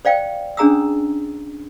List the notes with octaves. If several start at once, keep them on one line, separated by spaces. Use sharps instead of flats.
C5 D5 F5 G5
C#4 D4 G#4 A#5 D#6 E6